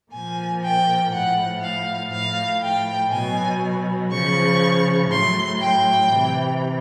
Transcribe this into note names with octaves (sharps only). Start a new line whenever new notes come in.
A#2 F3 G#5
G5
A2 F3 F#5
F5
A2 F3 F5
G5
B2 F#3 G#5
C#3 F3 C#6
A2 F#3 C6
G5
C3 E3